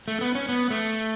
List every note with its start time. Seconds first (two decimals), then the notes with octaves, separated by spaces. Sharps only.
0.08 A3
0.21 B3
0.35 C#4
0.49 B3
0.70 A3